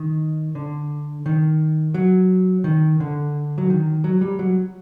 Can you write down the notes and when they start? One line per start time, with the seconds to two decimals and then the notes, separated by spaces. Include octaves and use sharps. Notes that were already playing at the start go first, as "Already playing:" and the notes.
Already playing: D#3
0.55 D3
1.26 D#3
1.94 F#3
2.64 D#3
3.00 D3
3.58 F#3
3.70 D#3
4.04 F#3
4.21 G3
4.39 F#3